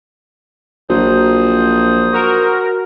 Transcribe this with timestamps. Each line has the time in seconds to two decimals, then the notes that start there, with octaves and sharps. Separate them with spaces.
0.90 A#1 F3 F#3 C5 D#6
2.11 F#4 A#4